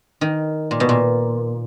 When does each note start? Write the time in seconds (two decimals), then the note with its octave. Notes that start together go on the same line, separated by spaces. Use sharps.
0.21 D#3
0.71 A#2
0.80 B2
0.89 A#2